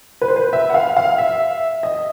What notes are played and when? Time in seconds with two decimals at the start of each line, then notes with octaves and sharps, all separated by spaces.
0.22 B4
0.28 C5
0.36 B4
0.53 E5
0.70 F#5
0.74 F5
0.97 F5
1.18 E5
1.83 D#5